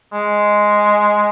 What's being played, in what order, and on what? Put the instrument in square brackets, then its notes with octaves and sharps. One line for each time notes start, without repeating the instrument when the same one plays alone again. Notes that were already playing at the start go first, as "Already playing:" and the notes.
[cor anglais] G#3